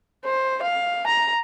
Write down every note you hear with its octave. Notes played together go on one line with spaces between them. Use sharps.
C5
F5
A#5